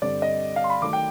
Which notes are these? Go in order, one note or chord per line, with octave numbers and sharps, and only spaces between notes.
G2 D3 G3 C4 D5
D#5
F5
C6
B5
D#3 F#3 A3 D6
G5